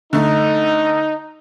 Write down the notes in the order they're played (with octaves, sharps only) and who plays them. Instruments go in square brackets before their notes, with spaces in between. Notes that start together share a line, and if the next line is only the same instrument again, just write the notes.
[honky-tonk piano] D3 A3 [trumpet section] D#4